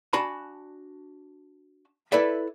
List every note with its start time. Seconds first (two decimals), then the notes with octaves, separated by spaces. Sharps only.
0.13 D4 F#4 G#5 A5 B5
2.12 E4 A4 B4 D5 E5